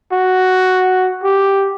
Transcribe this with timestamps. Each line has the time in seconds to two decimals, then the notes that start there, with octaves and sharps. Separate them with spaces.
0.13 F#4
1.24 G4